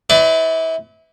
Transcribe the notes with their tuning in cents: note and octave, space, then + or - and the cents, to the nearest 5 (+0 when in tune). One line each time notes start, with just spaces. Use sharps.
E4 -30 B4 +35 D5 +0